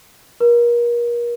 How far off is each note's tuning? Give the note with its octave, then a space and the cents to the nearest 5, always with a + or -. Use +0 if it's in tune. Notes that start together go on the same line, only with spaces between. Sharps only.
A#4 +35